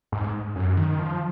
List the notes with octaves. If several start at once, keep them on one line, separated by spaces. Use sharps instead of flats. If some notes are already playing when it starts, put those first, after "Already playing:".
G#2
F#2
D#3
F3